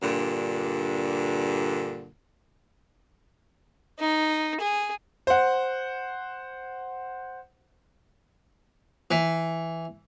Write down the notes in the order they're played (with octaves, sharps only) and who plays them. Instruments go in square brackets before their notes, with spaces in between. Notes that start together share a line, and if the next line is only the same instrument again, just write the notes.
[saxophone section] G2 A#2 D3
[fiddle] D#4
G#4
[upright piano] C5 F#5
[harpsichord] E3